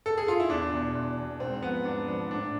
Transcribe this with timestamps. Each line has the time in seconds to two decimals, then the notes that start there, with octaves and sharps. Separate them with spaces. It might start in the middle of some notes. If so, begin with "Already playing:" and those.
0.06 A4
0.18 G#4
0.28 F4
0.40 E4
0.49 E2 D4
0.73 B2
0.95 E2
1.18 B2
1.40 G#2 C4
1.62 F3 B3
1.85 G#2 D4
2.08 F3 D4
2.30 A2 D4